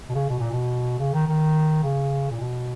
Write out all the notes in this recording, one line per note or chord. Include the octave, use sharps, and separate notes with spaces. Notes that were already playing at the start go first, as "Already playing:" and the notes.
B2
C#3
B2
A#2
B2
C#3
D#3
D#3
C#3
A#2
B2